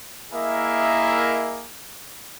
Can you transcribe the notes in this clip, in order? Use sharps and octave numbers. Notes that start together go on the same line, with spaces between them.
A#3 E4 G#4 A#4 D#5 E5